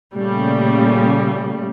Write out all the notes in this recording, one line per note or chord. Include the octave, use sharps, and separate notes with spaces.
A#2 C#3 G3 A3